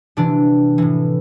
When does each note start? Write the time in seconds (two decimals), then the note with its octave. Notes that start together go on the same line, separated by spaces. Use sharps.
0.17 C3 E3 D4
0.78 A2 E3